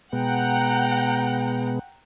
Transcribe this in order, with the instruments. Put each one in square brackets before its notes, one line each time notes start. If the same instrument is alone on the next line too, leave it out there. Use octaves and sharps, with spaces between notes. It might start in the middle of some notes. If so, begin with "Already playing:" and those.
[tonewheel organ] B2 G#3 B3 [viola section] F#5 G5 A#5